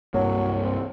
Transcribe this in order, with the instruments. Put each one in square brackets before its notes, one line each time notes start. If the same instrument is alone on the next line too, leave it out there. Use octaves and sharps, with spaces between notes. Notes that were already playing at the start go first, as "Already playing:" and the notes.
[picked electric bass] C2 G2 A#3 [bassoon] F#3
[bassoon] C4